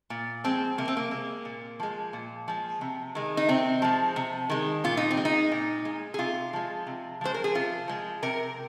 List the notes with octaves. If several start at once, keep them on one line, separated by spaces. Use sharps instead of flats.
A#2
F3 G#3 C4
C3 A#3
C4
A#3
G#3
A#2
F3 G#3
A#2
F3 G#3
C3
D#3 G#3
D#4
C3 C4
F3 G#3
C3
D#3 G#3
A#2 F4
D#4
C4
G#3
D#4
A#2
G#3
G#4
C3 F4
F3 G#3
C3
F3 G#3 C5
A#4
G#4
C3 F4
F3 G#3
C3 A#4